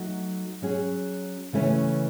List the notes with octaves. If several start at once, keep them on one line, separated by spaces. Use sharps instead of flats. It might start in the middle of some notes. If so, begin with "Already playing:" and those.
Already playing: F#3 A3 D#4
F#3 C#4 G#4
C#3 E3 A3 C#4